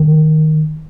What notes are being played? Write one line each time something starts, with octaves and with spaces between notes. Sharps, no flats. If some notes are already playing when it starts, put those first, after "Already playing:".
Already playing: D#3